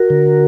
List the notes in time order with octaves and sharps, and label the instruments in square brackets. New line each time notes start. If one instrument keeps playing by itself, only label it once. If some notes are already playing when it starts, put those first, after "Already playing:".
Already playing: [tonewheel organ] F#4 A#4
D3